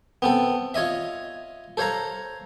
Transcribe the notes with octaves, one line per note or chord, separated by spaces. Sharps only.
B3 C4 A4
F4 C#5 D#5 E5
A4 C5 C#5 F5 A#5